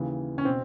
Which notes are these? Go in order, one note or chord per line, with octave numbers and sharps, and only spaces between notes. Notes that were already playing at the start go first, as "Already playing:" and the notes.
Already playing: D#2 C#3 E3
C#4
B2 C4